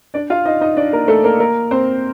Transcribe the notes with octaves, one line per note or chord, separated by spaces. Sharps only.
D4 D5
F4 F5
D#4 D#5
D#4 D#5
D4 D5
A#3 A#4
A3 A4
A#3 A#4
A#3 A#4
C4 C5